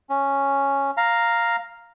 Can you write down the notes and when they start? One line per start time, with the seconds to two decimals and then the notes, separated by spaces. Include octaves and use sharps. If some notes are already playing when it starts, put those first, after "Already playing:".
0.10 C#4
0.97 F5 A#5